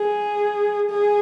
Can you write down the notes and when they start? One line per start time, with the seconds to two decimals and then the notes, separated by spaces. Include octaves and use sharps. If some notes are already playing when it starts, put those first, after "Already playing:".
Already playing: G#4
0.90 G#4